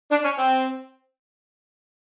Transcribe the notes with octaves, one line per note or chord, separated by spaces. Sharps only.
D4
C#4
C4